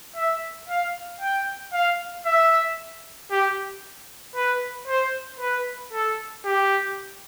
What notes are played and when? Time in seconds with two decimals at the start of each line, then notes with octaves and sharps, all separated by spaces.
0.16 E5
0.68 F5
1.21 G5
1.73 F5
2.25 E5
3.31 G4
4.35 B4
4.88 C5
5.40 B4
5.93 A4
6.45 G4